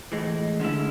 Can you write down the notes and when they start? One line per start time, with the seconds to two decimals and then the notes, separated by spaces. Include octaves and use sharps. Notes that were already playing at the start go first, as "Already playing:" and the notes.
0.12 A2 E3 G#3
0.60 D3 G#3 C#4 E4